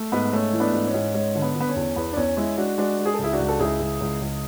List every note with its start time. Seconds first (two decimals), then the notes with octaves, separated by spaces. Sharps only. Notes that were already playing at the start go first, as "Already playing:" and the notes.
Already playing: A3
0.12 G#2 B3
0.33 A3 C#4
0.53 E3
0.60 B3 D4
0.73 G#2
0.87 C#4
0.94 G#2
1.14 G#3 C#4
1.35 D3
1.42 B3
1.55 D3
1.60 B3
1.69 C#4
1.76 E2
1.96 E2 B3
2.13 D4
2.17 E2 C#4
2.37 G#3 C#4 E4
2.57 G#3 D4 F#4
2.78 G#3 D4 F#4
2.99 G#3
3.05 G#4
3.14 A4
3.19 C#2 E4 G#4
3.33 D4 F#4
3.40 C#2
3.48 A4
3.60 C#2 E4 G#4
3.80 C#2
4.01 C#2
4.21 C#2